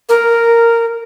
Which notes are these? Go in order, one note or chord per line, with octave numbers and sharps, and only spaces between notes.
A#4